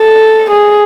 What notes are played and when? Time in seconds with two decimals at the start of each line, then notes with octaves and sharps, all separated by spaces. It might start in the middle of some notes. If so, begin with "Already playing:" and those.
Already playing: A4
0.51 G#4